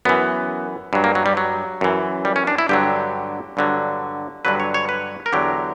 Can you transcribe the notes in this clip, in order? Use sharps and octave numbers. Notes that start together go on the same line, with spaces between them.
F#2 E3 B3
G2 F#3
A#3
F#3
G3
F#3
F#2 E3
G3
C#4
D4
E4
G2 D3 F#3 G4
G2 D3 F#3
G2 D3 F#3 B4
C#5
C#5
B4
A#4
E2 D3 F#3 G4